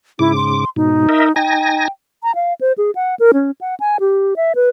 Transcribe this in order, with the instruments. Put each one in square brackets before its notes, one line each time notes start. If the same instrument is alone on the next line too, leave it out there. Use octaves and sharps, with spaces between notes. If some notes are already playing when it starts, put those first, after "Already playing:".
[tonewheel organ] G#2 C#3 D6 [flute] E4
[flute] C6
[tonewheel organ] G#2 B2 [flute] D#4
[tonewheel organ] A#4 D#5 E5
[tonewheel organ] D#4 G#5 A#6 [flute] G5
[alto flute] A#5
F5
C5
G#4
F#5
A#4
C#4
F#5
G#5
G4
E5
B4